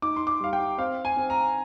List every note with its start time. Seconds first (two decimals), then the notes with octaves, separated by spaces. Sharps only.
0.02 D#4 D6
0.17 C6
0.27 D6
0.40 G3 F5
0.53 G5
0.78 C4 F5
1.05 G#5
1.17 C4
1.30 A#5